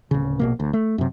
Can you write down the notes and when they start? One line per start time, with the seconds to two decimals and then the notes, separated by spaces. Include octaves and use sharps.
0.11 D1 C#3
0.39 A#1 B2 A#3
0.60 D2
0.73 A3
0.98 F#2 C3